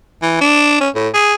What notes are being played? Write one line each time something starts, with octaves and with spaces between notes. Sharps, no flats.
E3
D4
C#4
A2
G#4